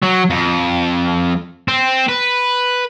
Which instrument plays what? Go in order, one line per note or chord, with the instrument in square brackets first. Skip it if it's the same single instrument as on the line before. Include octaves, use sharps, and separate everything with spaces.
[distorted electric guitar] F#3
F2
C4
B4